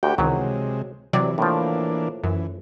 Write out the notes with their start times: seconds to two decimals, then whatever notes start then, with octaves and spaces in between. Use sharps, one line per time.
0.03 D2 F#4 G4 G5
0.18 C#2 C3 D#3 E3 F#3 G#3
1.13 C3 E3 F#3 C4 D5
1.38 A2 E3 F3 A#3 D4
2.24 F#2 E3